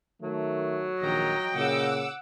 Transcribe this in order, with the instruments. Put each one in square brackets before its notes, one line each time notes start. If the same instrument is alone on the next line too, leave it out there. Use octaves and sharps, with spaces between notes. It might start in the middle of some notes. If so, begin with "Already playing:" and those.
[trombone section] D#3 A3 [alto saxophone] F#3
[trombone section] A#1 D#3 [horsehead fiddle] D#5 G5 [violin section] A#5
[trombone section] A#2 C#3 [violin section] F#5 D6 E6